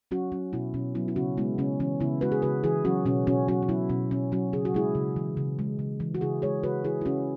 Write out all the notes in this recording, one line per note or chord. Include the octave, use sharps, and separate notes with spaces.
F#3 C#4 F#4
F#3 C#4
B2 B3 E4
B2 C#4
F#3 B3 E4
E4
C#3 C#4 F#4
G#3 B3 E4
C#3 C#4
E3 C#4
C#3 B3 E4
G#3 F#4 B4
G#4
C#3 F#4 B4
E3 E4 G#4
F#3 C#4 F#4
B2 C#4 F#4
B2 C#4 F#4
F#3 C#4 F#4
C#4
F#3 B3 E4
B2 C#4
B2 C#4
F#3 C#4 F#4
C#3 G#4
F#4
G#3 E4 G#4
C#3
E3
C#3
G#3
C#3
E3
F#4
C#3 E4 G#4
G#3 G#4 C#5
C#3 F#4 B4
E3 E4 G#4
E4
C#3 C#4 F#4